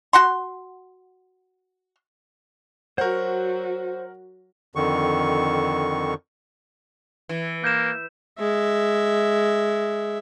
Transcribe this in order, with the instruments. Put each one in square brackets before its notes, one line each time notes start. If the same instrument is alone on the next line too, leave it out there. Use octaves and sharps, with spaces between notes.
[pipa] F#4 F#5 C6
[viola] F#3 F#4 [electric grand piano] A#4 F#5 [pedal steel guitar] C5 C#6
[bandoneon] F2 D3 D#3 C#6
[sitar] E3
[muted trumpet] A#3 [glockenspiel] G6 E7
[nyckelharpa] G#3 E5